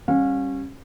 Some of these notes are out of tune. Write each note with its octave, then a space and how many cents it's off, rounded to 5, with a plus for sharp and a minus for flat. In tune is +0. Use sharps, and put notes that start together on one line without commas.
G3 +0 C#4 -25 F5 +35